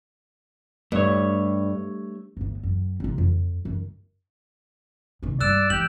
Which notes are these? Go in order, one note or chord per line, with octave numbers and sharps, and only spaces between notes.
G2 A3 C#5
G1 A2
F#2
C3 F4
F2
F#2
C2 D#3
G2 G3 D5 E6 F#6 E7
E3 G4 F#7